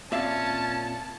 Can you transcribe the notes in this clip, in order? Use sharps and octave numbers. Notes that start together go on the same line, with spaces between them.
A#2 C4 C#4 E5 F5 A5